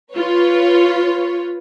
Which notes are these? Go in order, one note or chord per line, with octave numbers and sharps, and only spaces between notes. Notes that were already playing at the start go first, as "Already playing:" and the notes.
F4 B4 C#5